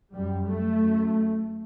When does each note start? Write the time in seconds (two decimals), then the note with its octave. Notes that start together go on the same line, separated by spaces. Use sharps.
0.13 F#2 G3
0.47 A3
0.80 F#2